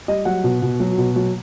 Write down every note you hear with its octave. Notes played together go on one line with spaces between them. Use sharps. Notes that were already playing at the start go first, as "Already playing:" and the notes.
G3 D#5
F#3 F#5
B2
B2
F#3
B2
F#3